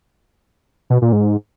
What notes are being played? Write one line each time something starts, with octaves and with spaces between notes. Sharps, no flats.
B2
A#2
G#2